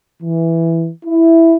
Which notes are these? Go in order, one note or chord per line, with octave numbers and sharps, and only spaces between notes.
E3
E4